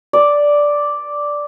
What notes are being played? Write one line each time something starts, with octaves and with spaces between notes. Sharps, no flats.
D5